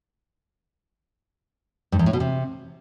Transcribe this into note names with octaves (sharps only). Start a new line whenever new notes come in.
G2
E2
A2
B2
C3